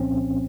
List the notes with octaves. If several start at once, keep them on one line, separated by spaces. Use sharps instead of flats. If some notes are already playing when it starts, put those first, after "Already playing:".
Already playing: C2 A#2 F3 C4 C#4